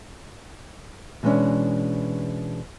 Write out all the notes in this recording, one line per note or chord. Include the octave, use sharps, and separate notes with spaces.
B2 E3 G#3 A#3 C#4 D4